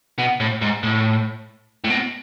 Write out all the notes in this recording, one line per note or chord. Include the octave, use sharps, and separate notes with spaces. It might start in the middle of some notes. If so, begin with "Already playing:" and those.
B2
A2
G#2
A2
A2
B2